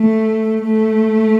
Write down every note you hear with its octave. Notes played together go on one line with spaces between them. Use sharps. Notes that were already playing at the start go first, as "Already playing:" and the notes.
Already playing: A3
A3